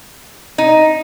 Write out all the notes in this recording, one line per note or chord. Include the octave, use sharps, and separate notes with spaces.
D#4